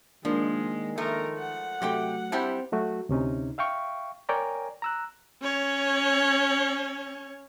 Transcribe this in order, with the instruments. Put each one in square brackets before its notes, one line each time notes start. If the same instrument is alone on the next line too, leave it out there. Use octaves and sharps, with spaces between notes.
[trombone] D#3 [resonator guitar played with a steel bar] F3 [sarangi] G#3 [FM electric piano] A#3 D4
[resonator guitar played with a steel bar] F3 A3 [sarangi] A#4
[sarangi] F#5
[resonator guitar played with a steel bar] C3 G4 G5 [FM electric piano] F#3 A3
[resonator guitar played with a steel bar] G3 E4 G4 [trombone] C4 [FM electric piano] A5
[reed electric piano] F#3 A3 F#4
D2 C3 C#4 D#4
E5 F5 G5 C#6
A#4 C#5 D5 G5 G#5 A#5
A#5 E6 F#6
[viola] C#4 C#5